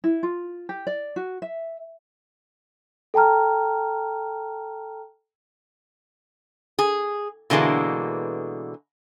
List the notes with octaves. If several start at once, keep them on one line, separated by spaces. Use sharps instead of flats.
E4
F4
G4
D5
F#4
E5
A4 G5 A5 A#5 F6
G#4
B2 D3 E3 G#3 A#3